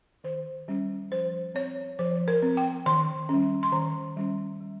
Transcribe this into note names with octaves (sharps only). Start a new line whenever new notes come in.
D#3 C5
G3 C#4
F3 C5
C4 C#5
F3 C5
A#4
C4
G5
D#3 C6
G3 C#4
C6
D#3 A#5
G3 C#4
G3